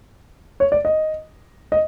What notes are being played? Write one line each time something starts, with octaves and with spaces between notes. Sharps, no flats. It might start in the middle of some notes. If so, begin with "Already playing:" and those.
C#5
D5
D#5
D#5